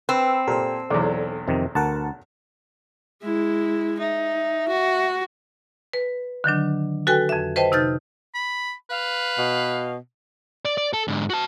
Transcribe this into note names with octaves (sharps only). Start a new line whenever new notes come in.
C4 B4 E6
A#2 G4 A4 C5
B1 E2 D5
F2 C3 D#3
D2 A#4 F#5 A5
G#3 E4
D#4 E5
F#4
B4
D3 D#3 F#3 D4
F#4 A4 B4 G5 G#5
F2 E5
B4 C5 D#5 E5 G5 A5
C3 D#4 F6 G6 A6
B5
B4 F5
B2
D5
D5
A4
G#2 D3
F#4 A5